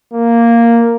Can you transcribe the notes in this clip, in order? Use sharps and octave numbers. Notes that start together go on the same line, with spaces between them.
A#3